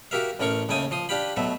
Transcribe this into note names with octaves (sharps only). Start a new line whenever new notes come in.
F#4 G4 A#4 E5 F5
A1 A3 C#4 A#4 C#6
D#2 C#3 A3 G5 G#5 D#6
F3 C6 D#6
D4 G4 F5 G5 B5
B2 F#3 A3 E5